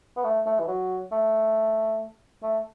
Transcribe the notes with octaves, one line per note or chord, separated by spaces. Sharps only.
B3
A3
A3
E3
F#3
A3
A3